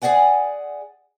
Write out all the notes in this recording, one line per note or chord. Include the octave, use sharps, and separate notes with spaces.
G#4 A4 D5 F#5 G#5